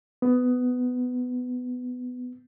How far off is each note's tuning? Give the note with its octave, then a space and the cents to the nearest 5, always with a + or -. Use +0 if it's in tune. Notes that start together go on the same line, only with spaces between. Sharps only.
B3 +15